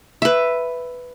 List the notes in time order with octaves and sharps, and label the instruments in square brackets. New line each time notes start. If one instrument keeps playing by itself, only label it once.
[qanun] B4 E5